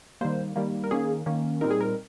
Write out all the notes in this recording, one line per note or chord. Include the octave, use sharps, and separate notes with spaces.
D#3 G3 A#3 C5
D#3 G3 A#3
A#4
D#3 A#3 C#4 G#4
D#3 A#3 C#4
A#2 G3 C4 D#4 A#4
G#4
A#4